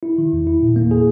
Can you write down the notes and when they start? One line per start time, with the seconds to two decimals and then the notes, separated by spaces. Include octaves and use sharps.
0.03 E4
0.18 D#3
0.33 E2
0.47 E4
0.61 A#2
0.76 A#3
0.91 G#4